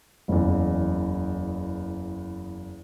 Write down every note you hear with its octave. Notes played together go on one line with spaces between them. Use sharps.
F#1 E2